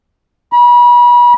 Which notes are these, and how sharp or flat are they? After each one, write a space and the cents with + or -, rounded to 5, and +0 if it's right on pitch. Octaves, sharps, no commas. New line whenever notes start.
B5 -35